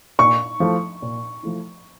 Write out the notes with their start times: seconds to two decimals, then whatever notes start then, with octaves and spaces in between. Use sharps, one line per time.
0.19 A#2 C#6
0.60 F3 A3 E4
1.02 A#2
1.43 F3 A3 E4